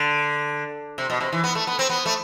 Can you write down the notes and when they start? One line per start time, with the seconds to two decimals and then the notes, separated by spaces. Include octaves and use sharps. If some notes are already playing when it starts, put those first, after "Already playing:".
Already playing: D3
0.98 C3
1.10 B2
1.21 C3
1.32 E3
1.44 B3
1.55 A3
1.67 B3
1.79 C4
1.90 B3
2.06 A3